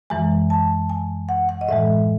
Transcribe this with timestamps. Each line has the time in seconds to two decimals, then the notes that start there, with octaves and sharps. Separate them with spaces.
0.10 F#2 E3 G#3 G#5
0.50 A5
0.90 G#5
1.29 F#5
1.49 F#5
1.61 D#5
1.68 A2 E3 G#3 E5